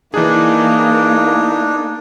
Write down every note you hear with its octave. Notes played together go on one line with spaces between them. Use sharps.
E3 A#3 D4 D#4 G#4